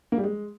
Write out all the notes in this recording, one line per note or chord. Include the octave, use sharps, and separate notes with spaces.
A#3
G3
G#3